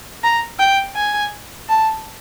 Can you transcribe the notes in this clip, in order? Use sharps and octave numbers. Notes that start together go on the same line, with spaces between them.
A#5
G5
G#5
A5